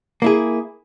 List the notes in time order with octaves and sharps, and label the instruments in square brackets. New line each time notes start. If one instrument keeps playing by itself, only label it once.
[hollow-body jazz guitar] A#3 E4 G#4